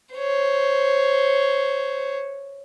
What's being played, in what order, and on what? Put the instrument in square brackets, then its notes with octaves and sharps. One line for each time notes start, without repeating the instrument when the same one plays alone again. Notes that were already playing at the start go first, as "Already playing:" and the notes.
[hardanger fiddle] C5 C#5